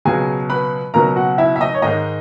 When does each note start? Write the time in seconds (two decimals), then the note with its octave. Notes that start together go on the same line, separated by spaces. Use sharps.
0.05 C#2 B2 F#3 G#4 G#5
0.50 B4 B5
0.94 C#2 B2 F#3 A#4 A#5
1.16 F#4 F#5
1.38 E4 E5
1.56 E5
1.60 D#4 D#5
1.74 C#5
1.82 G#2 D#3 G#3 D#4 D#5